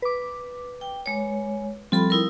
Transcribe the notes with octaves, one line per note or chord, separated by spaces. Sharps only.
B4 D6
G5
G#3 C#5
F3 G3 C4 F4 A4 B5
D#4 E4 A#4